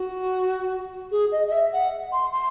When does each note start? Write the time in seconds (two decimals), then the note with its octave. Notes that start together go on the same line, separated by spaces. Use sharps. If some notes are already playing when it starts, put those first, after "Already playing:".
Already playing: F#4
1.11 G#4
1.31 D#5
1.46 D#5
1.51 E5
1.72 F#5
2.12 C6
2.31 C6